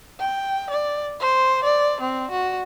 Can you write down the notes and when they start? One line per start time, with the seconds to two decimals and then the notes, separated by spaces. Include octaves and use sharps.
0.20 G5
0.70 D5
1.20 C5
1.64 D5
2.00 C4
2.31 F#4